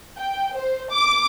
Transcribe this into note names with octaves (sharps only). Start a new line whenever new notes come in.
G5
C5
D6